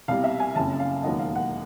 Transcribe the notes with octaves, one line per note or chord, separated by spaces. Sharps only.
C2 B2 G3 F5
E5
G#5
F#1 F2 C#3 A5
F5
E1 D#2 D#3 F#3 B3 D#5
F5
F#5